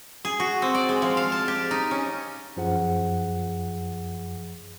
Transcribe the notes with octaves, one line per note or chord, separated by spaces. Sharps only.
G#4
F#4
C4
D5
G#3
F3
F5
A5
G4
D#4
C#4
F#2 F3 G#4 F#5